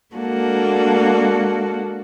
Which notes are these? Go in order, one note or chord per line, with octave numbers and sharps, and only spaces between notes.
G#3 A#3 D4 F#4 A4